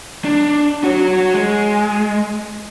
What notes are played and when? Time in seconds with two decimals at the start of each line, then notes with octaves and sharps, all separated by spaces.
0.25 D4
0.84 F#4 C#5
1.34 G#3